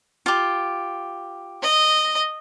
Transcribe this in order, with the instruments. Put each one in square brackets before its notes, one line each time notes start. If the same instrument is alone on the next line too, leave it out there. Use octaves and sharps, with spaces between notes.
[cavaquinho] F4 G4
[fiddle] D#5